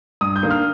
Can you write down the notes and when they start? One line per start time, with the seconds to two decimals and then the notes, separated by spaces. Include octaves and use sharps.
0.21 G2 D#6
0.36 G6
0.43 D#3 A#3 D4
0.51 F6